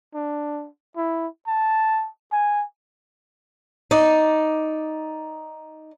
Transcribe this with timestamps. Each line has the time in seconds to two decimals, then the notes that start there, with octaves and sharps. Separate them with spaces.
0.14 D4
0.97 E4
1.47 A5
2.32 G#5
3.91 D#4 D5